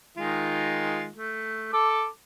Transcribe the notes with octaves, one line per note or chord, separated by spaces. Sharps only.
D#3 G#3 F4
A3
A4 D6